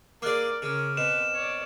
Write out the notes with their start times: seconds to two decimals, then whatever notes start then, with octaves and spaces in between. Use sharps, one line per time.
0.22 A#3 G#4 A#4 D5 D6 F6 F#6
0.62 C#3 C#4 A#4 F6 D7
0.97 B2 C4 B4 E7
1.34 C#5 D5